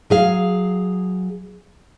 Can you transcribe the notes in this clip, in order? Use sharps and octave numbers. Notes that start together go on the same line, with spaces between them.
F#3 G#4 F5